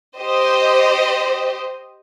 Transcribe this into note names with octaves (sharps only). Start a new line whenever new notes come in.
G4 C5 D#5